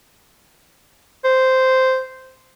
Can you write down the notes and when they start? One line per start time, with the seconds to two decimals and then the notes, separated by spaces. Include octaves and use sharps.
1.24 C5